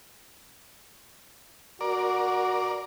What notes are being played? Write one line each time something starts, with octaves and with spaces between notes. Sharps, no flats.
F#4 A#4 D5